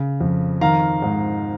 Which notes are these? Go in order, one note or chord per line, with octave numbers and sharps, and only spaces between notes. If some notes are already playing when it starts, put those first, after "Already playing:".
Already playing: C#3
F2
D#3 F5 A#5
G#2